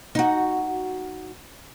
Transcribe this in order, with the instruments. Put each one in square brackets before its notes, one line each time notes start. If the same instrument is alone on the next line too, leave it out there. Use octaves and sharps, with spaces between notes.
[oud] D#4 F#4